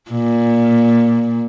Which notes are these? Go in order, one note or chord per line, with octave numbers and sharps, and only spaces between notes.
A#2